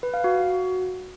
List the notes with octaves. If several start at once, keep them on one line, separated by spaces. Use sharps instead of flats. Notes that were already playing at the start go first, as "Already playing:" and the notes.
B4
F5
F#4